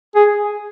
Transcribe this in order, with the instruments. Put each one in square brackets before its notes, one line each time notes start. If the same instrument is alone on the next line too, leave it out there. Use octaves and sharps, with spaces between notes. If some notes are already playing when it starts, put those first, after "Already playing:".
[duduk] G#4